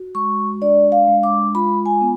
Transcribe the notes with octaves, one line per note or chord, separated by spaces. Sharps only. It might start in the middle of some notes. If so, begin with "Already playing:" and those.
Already playing: F#4
G#3 C#6
D4 D5
F5
G#3
D6
F4 B5
G#5
B3